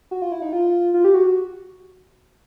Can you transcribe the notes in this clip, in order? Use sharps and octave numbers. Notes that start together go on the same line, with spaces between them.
F#4
F4
E4
D#4
F4
F4
G4
F#4